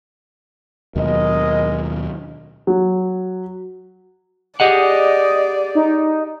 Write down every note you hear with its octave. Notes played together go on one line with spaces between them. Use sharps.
D#2 B2 F#3 G#3 A#4 D#5
F#3
G4 G#4 D5 D#5 F#5
D#4